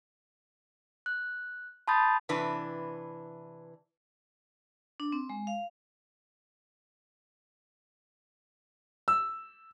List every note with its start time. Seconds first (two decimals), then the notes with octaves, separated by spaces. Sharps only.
1.06 F#6
1.88 A5 B5 C6 D#6 G6 A6
2.29 C3 E3 D4 B4
5.00 D4
5.12 C4
5.30 G#3
5.47 F5
9.08 E6